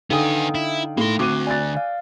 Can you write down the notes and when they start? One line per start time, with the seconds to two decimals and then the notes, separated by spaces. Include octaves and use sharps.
0.10 D3 B3 D#4 F5 G5 G#5 D#6
0.55 E4
0.97 A2 A#3 C6
1.19 D3 A3 C4 F#4 D6 F#6 D#7
1.47 D5 G#5 F#6 A6
1.77 F5